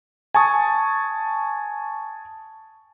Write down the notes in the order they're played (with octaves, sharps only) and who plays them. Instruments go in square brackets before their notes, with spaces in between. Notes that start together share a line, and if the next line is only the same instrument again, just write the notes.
[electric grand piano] G#5 A5 C#6 D#6